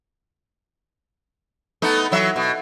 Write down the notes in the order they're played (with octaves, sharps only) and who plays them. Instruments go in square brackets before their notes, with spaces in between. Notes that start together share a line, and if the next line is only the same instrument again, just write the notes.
[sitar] A3 B3 D#4
E3 F#3 E5
B2